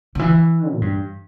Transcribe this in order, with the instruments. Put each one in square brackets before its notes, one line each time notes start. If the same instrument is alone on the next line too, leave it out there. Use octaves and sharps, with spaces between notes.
[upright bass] D3
E3
A2
G2